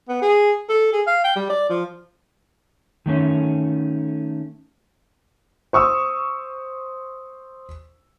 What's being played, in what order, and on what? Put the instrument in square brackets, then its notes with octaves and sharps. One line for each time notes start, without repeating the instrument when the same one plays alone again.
[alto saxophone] B3
G#4
A4
G#4
F5
G5
G3
D5
F3
[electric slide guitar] D#3 A3 C#4
[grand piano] C5 C#6 D#6 E6